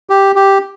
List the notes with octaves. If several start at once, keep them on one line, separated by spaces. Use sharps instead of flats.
G4
G4